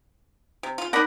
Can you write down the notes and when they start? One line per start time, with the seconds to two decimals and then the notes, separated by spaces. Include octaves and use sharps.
0.63 C3
0.78 C#3 F4
0.93 D#4 A#4 D5 F#5 B5